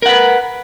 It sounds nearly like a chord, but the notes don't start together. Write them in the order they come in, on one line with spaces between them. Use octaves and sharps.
A#4 F#5 B4